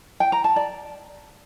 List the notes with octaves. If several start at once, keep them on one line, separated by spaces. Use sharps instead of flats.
G5
A#5
A5
D5